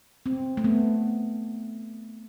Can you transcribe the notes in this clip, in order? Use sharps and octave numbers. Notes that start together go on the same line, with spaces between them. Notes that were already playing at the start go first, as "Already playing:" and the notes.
C4
A3
B3